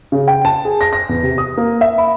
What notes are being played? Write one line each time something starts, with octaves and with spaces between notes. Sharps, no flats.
C#3
G5
A5
G#4
A#6
A#6
E2
C3
D#6
A#3
E5
B5